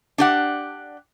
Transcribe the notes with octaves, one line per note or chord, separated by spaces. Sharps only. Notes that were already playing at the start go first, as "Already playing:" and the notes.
D4 G4 F#5